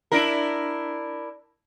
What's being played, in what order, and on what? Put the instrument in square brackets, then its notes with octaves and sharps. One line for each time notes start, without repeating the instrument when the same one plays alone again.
[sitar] D4 E4 A#4